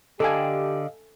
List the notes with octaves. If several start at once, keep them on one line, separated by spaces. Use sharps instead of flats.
D3 G4 A4 D5 D#5 F5 G#5